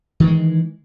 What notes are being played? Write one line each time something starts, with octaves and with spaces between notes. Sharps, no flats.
D#3 E3 G#3